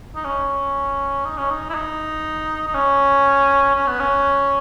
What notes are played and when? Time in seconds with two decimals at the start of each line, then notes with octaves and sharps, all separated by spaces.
0.16 D#4
0.24 C#4
1.25 D#4
1.38 C#4
1.50 D#4
1.70 E4
1.75 D#4
2.68 D#4
2.74 C#4
3.75 C#4
3.87 B3
4.00 C#4